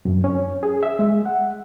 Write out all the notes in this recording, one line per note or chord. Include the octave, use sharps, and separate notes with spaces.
F#2
C#4
G#4
E5
G#3
F#5